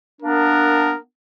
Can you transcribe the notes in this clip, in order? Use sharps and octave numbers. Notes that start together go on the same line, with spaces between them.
A#3 B3 D4 A#4